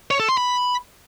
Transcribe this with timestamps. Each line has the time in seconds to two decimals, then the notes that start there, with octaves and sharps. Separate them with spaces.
0.11 C#5
0.20 A4
0.29 C6
0.37 B5